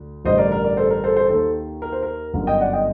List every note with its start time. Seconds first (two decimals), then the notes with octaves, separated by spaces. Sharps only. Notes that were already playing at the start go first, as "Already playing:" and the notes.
Already playing: D2
0.25 A1 G2 D3 C5 D#5
0.38 A#4 D5
0.52 A#4
0.64 A#4 D5
0.77 A4 C5
0.90 A#4
1.04 A4 C5
1.16 A4 C5
1.29 D#2 D#3 A4 C5
1.82 A#4
1.92 C5
2.03 A#4
2.34 G1 F#2 D3 A#4
2.47 D#5 G5
2.60 D5 F#5
2.73 D#5 G5